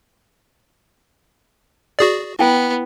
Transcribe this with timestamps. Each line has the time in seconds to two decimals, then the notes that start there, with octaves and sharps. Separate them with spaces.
1.99 F#4 G#4 D5
2.39 B3 E4 G5